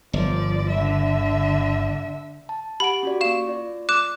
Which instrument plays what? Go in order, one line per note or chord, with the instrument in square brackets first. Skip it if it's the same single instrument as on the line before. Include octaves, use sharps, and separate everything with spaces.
[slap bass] G1 [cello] F3 D5
[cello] D3 E5
[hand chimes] A5
[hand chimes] G4 F#5 D7 [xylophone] B5
[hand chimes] C#4 F#4 D5
[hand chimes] A#3 C#6 [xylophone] F5 E7
[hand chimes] F4 D5
[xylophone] D6 F#6 E7